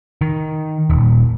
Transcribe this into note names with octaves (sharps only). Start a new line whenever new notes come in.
D#3
D#1